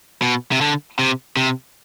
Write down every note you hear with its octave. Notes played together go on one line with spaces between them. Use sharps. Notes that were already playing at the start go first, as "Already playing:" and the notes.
B2
C3
D3
C3
C3